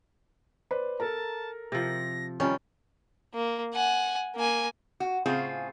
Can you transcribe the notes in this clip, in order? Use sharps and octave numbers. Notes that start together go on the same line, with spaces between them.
B4 C5 D5
A4 A#4 A5 A#5
C3 F3 A#6
D#3 F3 G3 C#4
A#3
F#5 G#5
A#3 G#5
F#4
A2 C#3 C4 F4 G#4